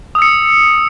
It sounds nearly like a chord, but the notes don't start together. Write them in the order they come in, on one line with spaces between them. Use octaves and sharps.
D#6 E6 C#7